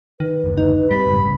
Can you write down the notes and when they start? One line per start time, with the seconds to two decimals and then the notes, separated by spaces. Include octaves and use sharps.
0.20 D#3 B4
0.44 F#1 D2
0.58 D#4
0.91 A2 G3 C4 B5
1.07 F#1 G#2
1.21 C2 A2 C#3